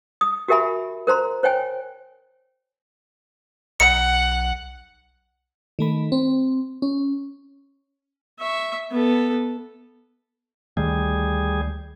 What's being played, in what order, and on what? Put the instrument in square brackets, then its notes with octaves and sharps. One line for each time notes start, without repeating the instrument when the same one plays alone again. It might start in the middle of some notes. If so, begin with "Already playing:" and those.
[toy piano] D#6
F#4 G4 A#4 E5 G#5 B5
A#4 C5 A#5 C6
C5 C#5 G5 G#5
[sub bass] B1 [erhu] F#5 [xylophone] C#7
[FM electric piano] D#3 A3 B5
C4
C#4
[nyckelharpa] E5 C#6
B3 A4
[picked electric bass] D2 D#3 A3 [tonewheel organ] G3 G#4